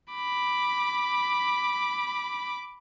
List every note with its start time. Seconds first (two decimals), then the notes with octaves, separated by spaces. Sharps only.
0.13 B5 D6